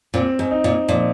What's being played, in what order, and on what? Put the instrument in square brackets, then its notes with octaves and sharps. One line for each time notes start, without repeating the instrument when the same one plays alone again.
[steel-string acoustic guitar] A#2 [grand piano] C4
[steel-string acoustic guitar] G#2
[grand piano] D#4
[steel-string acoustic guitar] A#2
[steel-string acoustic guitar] A#2 [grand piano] F3